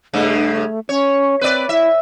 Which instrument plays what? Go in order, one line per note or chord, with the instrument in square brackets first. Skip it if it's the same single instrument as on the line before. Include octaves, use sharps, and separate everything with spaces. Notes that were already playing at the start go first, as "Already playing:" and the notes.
[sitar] G2 C#3 [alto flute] A3
[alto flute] C#4 [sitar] C#5
[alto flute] C4 [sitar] B4 D5
[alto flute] E4 [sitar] E5